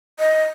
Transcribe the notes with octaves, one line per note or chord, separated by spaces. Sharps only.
D#5